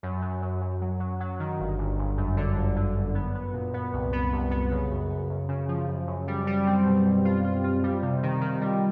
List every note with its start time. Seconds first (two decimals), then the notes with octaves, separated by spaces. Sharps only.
0.03 F#2
0.22 F#2
0.42 F#2
0.61 F#2
0.81 F#3
1.00 F#3
1.20 F#3
1.40 D#3
1.60 G1
1.78 G1
1.98 G1
2.17 F#2
2.37 D3
2.56 G1
2.76 D3
2.96 F#2
3.15 B3
3.35 B3
3.53 A#2
3.74 B3
3.93 C2
4.13 B3
4.33 C2
4.51 B3
4.71 C#3
4.91 F#2
5.10 F#2
5.30 F#2
5.49 C#3
5.68 F3
5.88 F#2
6.07 F#2
6.27 G3
6.47 G3
6.67 C4
6.85 B2
7.06 B2
7.25 F4
7.44 F4
7.64 F4
7.84 G3
8.02 C3
8.23 D#3
8.41 D#3
8.61 G3